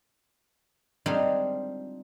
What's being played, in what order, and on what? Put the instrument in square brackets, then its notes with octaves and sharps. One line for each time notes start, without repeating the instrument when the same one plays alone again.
[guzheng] G3 G#3 C4 D4 D#4 F4